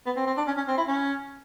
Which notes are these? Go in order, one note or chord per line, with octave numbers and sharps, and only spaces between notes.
B3
C4
C4
D4
C#4
C#4
C4
E4
C#4